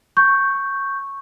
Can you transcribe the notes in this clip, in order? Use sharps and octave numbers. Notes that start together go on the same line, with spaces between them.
C#6 G6